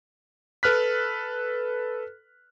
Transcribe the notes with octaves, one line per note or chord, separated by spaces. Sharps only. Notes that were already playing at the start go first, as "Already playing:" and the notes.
A4 B4 F6 F#6 B6